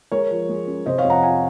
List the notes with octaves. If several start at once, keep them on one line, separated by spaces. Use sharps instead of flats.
G#3 A#4 C#5
F3
G#3
C#4
C3 C5 D#5
C#5 F5
F2
F#5 A#5
F3 F5 G#5